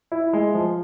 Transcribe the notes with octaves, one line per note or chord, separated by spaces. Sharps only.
E4
G#3
F3